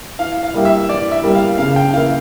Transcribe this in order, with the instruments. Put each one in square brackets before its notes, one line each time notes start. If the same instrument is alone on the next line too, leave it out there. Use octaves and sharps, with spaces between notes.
[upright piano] E3 [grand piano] F5
[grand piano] F5
[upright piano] G3 A#3 E4 G4
[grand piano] E5
[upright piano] E3 [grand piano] D5
[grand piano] E5
[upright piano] G3 A#3 E4 G4
[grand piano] F5
[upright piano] C#3 [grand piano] F5
[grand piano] G5
[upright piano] E3 A#3 E4 [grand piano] F5